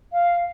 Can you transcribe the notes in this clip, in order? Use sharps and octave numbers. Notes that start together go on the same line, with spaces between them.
F5